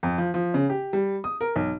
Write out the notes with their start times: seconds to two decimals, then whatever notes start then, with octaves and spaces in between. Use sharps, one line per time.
0.03 F2
0.18 F3
0.34 F3
0.54 C#3
0.70 G4
0.93 G3
1.24 D#6
1.41 A#4
1.56 B1